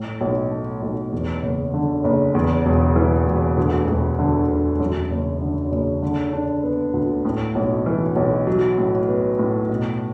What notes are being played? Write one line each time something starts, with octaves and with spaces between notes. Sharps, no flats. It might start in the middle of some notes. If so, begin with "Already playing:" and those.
Already playing: A2
B1
A3
B1
E2
F#1
D3
F#1
E2
E1
E3
E1
D2
E1
D3
E1
F#2
F#1
D3
F#1
D3
D4
B3
D2
A2
B1
E3
B1
F#3
A2
B3
A2
B2